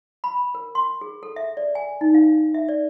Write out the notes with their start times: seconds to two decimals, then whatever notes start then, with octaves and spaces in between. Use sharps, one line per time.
0.24 B5
0.55 A#4
0.75 C6
1.01 G#4
1.23 A4
1.36 E5
1.57 D5
1.75 G#5
2.01 D#4
2.14 F5
2.54 E5
2.69 D5